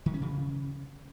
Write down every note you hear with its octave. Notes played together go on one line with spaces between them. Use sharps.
D#3
C#4
C#3